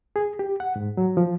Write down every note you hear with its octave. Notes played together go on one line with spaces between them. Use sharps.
G#4
G4
F#5
G#2
F#3
F3